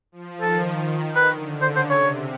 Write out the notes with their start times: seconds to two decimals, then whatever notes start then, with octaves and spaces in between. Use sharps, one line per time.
0.12 F3
0.41 D#3 A4
1.16 B4
1.32 D3
1.61 C#3 C5
1.76 C5
1.91 C3 C#5